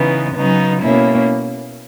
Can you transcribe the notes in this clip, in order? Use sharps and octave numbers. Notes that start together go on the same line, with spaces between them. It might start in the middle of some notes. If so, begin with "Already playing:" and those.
Already playing: C#3 E3 B3 D#4
C#3 F#3 B3 D#4
B2 A#3 C#4 E4